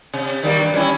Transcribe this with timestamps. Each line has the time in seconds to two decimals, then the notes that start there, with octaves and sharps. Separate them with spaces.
0.13 C3
0.43 D#3 G3 A#3
0.60 G2
0.74 G3 C#4 E4